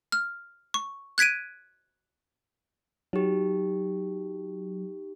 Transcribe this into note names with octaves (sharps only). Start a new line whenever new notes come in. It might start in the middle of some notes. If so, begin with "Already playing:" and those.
F6
C#6
F#6 G#6 B6 D7 D#7
F#3 D#4 G4